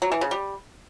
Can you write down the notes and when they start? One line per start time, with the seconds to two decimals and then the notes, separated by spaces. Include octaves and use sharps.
0.02 F#3
0.12 E3
0.21 C#3
0.31 G3